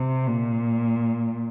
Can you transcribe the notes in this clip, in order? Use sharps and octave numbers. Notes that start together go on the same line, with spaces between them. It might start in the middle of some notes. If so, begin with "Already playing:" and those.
Already playing: C3
A#2